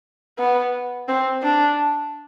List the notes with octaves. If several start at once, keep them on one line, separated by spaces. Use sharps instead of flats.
B3
C4
D4